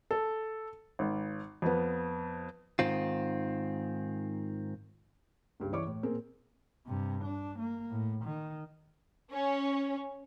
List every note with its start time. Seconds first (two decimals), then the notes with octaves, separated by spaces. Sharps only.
0.11 A4
0.99 G#1
1.62 F2 B3
2.79 G#2 D#3 C4 F4
5.60 C#2 G2
5.72 E3 E4 C#5 D5 C#6 D6
5.87 A2
6.03 A#2 C4 G#4 A#4
6.87 G2 C3
7.24 D4
7.59 A#3
7.91 A2
8.24 D#3
9.32 C#4